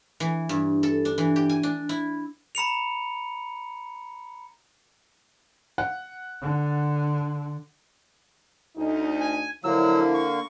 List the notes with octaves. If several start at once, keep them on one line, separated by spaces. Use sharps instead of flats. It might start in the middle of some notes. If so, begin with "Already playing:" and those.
E3
G2
A4
D4
E3
G4
G#5
D4
E4
A#5 B5 C#7 F7
F#5
D3
D2 D#4
G#5
D3 F3 F#3 A#3 E4 E6
C#6